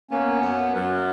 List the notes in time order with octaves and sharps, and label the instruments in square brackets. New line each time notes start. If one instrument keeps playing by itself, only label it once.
[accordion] A#3 C#4 [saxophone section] B3
[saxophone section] F#2
F#2